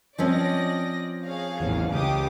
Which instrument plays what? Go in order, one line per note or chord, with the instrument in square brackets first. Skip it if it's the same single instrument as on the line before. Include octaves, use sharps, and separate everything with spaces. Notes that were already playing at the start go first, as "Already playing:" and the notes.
[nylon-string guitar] F3 C4 C#4 [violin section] D5 D#5 A#6
[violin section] G#4 C#5 F5
[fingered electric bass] A1 E2
[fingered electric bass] C#2 [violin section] G4 D6 D#6